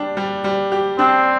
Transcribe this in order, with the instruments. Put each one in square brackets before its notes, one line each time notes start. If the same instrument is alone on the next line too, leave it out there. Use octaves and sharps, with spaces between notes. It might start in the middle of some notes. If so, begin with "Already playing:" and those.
Already playing: [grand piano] G3 D4 G4
G3
G3
G4
[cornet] C4 [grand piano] D4